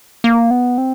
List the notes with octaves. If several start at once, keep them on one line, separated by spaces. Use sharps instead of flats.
A#3
B3
C4